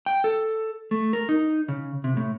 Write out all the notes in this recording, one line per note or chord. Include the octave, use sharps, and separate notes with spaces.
G5
A4
A3
A#4
D#4
C#3
C3
A2